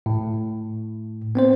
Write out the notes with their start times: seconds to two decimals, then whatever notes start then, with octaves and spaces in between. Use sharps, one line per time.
0.06 A2
1.35 B3 C4 C5